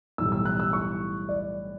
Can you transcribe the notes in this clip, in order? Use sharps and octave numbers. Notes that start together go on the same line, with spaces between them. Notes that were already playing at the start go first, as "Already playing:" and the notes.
B1 A2 E3 G3 E6
E6
F#6
E6
C#6
D5